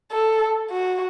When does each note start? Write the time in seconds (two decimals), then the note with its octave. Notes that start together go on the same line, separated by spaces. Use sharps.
0.12 A4
0.71 F#4